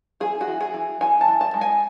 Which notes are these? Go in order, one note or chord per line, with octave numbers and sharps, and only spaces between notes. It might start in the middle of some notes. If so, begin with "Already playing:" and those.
E3 G#4
F#4
E3
G#4
E3
E3 G#5
A5
E3
A5
G#3
G#5